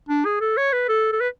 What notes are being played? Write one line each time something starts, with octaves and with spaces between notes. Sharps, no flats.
D4
G#4
A4
C#5
B4
A4
A4
B4